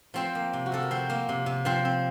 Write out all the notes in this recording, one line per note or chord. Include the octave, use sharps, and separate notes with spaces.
F3 C4 C5
A#3
C3
F#4
C3 A4
A#4
F3 C4 C5
A#3
C3
C3
F3 C4 C5
C4